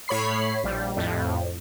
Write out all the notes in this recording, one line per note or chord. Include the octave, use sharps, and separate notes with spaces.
A2 C#5 B5 C7
A#1 G3
F2 A2